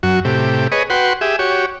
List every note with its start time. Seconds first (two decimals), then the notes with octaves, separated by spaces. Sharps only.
0.03 F#2 F#4
0.25 A2 C3 G4
0.72 G#4 B4 C#5 D#5
0.90 F#4 B4 F#5 G5 C6
1.21 G4 G#4 E5
1.39 F#4 G4 C#5